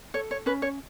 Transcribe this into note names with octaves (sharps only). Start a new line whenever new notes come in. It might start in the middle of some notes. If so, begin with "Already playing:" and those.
A4 C#5
C#5
C#4 B4
C#5